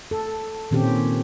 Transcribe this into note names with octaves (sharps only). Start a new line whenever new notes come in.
A4
A#2 D#3 C4 C#4 G4